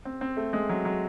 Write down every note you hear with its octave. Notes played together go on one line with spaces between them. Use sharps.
C4
C4
A3
G#3
F#3
F#3